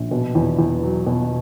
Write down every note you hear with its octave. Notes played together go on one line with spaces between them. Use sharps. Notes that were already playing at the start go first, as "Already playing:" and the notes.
Already playing: A#1
B2
E2
E2
F#3
B2